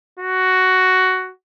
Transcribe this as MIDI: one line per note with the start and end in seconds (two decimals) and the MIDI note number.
0.19 1.31 66